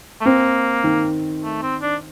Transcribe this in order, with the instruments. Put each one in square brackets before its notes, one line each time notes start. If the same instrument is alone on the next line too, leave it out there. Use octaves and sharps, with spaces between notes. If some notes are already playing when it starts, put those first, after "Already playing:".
[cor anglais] A3
[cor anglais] A#3 [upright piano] C4
[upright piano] D#3
[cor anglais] A3
C4
D4